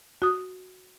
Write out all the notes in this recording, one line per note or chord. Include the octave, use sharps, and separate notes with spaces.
F#4 D#6